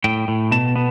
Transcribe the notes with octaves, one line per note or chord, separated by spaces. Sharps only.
A2 G5
A2
B2 A5
B3